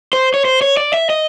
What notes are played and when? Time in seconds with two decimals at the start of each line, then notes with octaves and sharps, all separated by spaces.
0.13 C5
0.34 C#5
0.45 C5
0.61 C#5
0.77 D5
0.94 E5
1.10 D#5